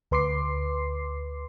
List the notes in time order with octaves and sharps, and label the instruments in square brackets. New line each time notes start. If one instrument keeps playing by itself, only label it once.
[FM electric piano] D2 B4 C6 D6 C7